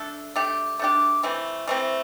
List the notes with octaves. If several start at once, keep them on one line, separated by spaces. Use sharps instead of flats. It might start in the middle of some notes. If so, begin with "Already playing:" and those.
Already playing: A3 D4 A4
A3 D4 G4
A3 D4 G4
E3 A3 C4
E3 A3 C4